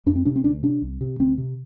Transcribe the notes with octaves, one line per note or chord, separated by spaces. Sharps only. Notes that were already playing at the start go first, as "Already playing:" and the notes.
F2 D4
C4
C3 D4
C4
D2 D4
C3 D4
C2
C3
D2 C4
C3